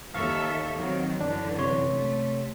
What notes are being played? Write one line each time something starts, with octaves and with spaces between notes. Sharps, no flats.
D#2 A4 E5 F5 C#6 F6
D#3 F#3 C4
F#2 D3 E3 D4
C3 C#5 C6
A3